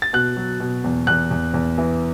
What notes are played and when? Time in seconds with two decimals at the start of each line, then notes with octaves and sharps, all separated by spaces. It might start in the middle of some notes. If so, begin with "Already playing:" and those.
0.02 A6
0.13 B2 F#6
0.37 F#3
0.60 B2
0.84 E2
1.07 E2 F#6
1.31 E2
1.54 E2
1.78 E3